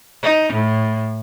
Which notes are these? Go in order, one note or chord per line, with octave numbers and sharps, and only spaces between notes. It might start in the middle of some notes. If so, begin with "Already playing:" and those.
D#4
A2